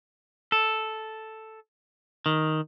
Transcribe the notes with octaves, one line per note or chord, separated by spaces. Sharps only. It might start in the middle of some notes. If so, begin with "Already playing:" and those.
A4
D#3